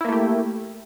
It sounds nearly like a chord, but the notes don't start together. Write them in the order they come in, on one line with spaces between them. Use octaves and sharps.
E4 A#3 A3 G4